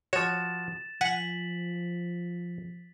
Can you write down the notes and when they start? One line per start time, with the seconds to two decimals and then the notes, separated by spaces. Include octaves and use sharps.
0.13 F3 F#4 C#5 A6 E7
1.01 F3 F#5 G#5 B6 F#7